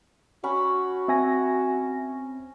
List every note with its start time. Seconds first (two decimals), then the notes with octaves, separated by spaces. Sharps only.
0.44 C#4 F#4 B5
1.08 C4 E5 G#5 A#6